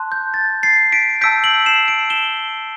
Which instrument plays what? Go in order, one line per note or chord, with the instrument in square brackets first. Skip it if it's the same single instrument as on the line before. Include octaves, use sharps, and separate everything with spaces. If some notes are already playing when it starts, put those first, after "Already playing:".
Already playing: [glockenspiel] A5 C6 F#6
G6
A6
A6 C7
B6 D7
A5 E6 G6 B6 D7
D7 F#7
C7 E7
D7 F#7
E7 G7